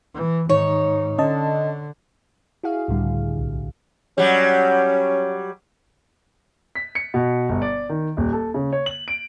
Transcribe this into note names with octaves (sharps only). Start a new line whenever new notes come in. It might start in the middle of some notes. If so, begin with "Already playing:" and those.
E3
G#2 D#3 D#4 C#5
D3 C#4 D#5 A5
E4 F#4 G#4 F5
C#2 A2 D3 G3
B1
F#3 G3 C#4
B6
C#7
B2
G1
D5
D#3
D#1
A4
C#3
C#5
F#7
D7